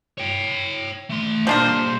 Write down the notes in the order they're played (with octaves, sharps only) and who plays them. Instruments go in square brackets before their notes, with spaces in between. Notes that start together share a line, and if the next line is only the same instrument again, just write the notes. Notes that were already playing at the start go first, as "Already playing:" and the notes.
[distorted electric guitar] C#5 G5
A3 C6
[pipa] F3 D4 A#4 [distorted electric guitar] G3 A#3 [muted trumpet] C5